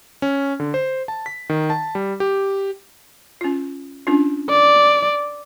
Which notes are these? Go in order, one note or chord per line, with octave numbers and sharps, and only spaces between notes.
C#4
D3
C5
A5
B6
D#3
A5
G3
G4
C#4 F4
C#4 D4 F4
D5